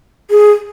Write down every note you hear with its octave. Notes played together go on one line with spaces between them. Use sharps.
G#4